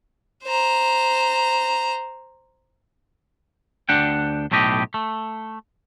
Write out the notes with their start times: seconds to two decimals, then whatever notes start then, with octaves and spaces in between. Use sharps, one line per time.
0.44 C5 A#5
3.89 D2 D4 F#5 G5
4.52 B1 A2 A3 G4 D#5
4.94 A3